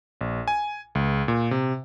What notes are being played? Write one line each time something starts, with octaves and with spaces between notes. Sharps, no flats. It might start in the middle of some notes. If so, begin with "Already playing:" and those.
A#1
G#5
C#2
A#2
C3